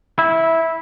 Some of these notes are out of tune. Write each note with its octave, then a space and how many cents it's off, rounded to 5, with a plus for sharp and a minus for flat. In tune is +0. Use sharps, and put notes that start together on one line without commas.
E4 -10